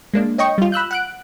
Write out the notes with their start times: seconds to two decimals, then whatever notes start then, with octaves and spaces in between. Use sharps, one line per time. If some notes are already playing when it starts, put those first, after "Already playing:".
0.14 G#3 A#3 D4
0.38 C#5 D#5 G5 C#6
0.58 G3 F4
0.72 B5 E6 F#6 G6
0.91 F#5 F#6 D7